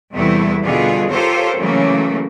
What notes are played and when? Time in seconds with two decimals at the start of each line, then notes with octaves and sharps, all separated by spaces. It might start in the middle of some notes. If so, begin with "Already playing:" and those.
0.13 E2 C3 G3 A3 B3 E4
0.63 B2 D3 G3 B3 F4 G#4
1.11 F4 G4 A4 A#4 C5 C#5
1.57 C#3 E3 F#3 A3 A#3